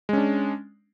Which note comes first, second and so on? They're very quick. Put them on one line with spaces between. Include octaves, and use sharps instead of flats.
G#3 C#4 D4